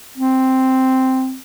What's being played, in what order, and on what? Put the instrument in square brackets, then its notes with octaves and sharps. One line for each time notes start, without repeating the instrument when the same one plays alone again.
[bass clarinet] C4